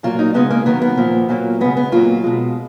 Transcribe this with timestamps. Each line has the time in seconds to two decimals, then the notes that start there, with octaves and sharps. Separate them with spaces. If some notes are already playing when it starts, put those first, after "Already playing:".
0.03 A#2 F#3 A#3 F4
0.19 D#4
0.34 C#3 G#3 B3
0.51 A#3
0.66 D#3 F#3 A#3 B3
0.82 B3
0.97 A#2 F3 A#3
1.29 A#2 F#3 A#3
1.61 C#3 G#3 B3
1.77 B3
1.92 A#2 F#3 A#3 F4
2.24 B2 G#3